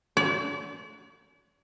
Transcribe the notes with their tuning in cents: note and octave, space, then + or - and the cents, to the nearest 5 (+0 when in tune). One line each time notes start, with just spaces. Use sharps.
D5 -40